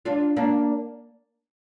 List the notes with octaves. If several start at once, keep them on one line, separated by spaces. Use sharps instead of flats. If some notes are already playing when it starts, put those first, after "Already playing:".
D4 F4
A#3 D4